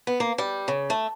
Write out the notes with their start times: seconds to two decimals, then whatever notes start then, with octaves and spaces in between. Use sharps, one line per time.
0.07 B3
0.20 A#3
0.38 G3
0.68 C#3
0.90 A3